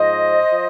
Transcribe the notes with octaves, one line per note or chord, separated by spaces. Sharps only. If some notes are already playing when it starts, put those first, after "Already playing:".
Already playing: G#2 F3 C5 D#5
F3